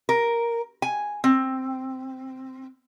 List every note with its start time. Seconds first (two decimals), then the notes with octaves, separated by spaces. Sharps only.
0.09 A#4
0.82 G#5
1.24 C4